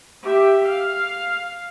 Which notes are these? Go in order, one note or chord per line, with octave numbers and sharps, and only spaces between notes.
G4 E5
F5